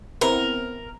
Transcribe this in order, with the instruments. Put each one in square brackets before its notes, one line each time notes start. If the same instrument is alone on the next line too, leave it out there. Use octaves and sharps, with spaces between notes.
[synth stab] B3 C4 E4 [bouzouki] A#4